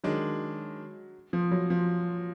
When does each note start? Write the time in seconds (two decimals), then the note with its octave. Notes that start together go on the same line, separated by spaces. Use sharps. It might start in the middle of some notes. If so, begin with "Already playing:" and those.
0.04 D#3 F#3 G#3 D4
1.33 F3
1.51 F#3
1.70 F3